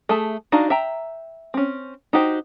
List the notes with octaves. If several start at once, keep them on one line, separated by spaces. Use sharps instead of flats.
A3 G#4 E5 A5
D4 D#4 F#4 F5
E5 G5 A#5
C4 C#4
D#4 F#4 G4 C5